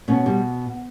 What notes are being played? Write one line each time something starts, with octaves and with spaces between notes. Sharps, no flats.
B2 C#4
G3